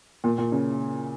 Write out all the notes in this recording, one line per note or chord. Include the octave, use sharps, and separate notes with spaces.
A#2
A#2
C#3